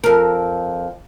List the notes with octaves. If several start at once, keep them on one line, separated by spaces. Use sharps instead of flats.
F2 A#4